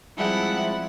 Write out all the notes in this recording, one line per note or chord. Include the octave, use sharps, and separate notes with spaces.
F3 G3 G#3 C4 D4 E4 F#5